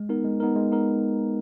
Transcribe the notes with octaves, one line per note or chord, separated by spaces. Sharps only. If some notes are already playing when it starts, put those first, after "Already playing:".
Already playing: G#3
B3 D#4 A#4
G#3
B3 D#4 A#4
G#3
B3 D#4 A#4